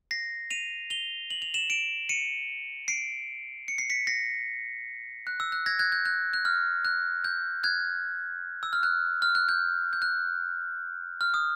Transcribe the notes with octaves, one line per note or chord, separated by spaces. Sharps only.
A#6 C7
D#7 F7
F7 G7
F#7
F7
E7 F#7
D7 E7
C#7 D#7
C7 D7
C#7
C7
B6 C#7
A#6 C7
F#6
E6
F#6
G#6 A#6
F#6 G#6
G6
F#6
F#6
F6
F#6
G6
F#6 G#6
E6
F6
F#6
F6
F#6
G6
G6
F#6
F6
D#6